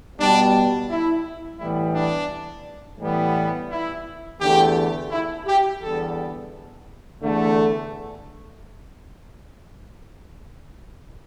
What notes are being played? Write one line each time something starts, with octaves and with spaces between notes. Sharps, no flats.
B2 G3 B3 D4
E4
A2 E3 G3 B3 E4
D4
A2 E3 G3 B3
E4
E2 D3 A3 G4
E4
G4
E2 D3 G3 B3 A4
E2 D3 A3